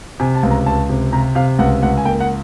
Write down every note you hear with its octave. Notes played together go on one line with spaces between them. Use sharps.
C3 G#5
A5
C#2
A#5
C#2 A5
C3
C3 A#5
C3 F5
C#2 F#5
C#2 F#5
G#5
A#3 G5
F#5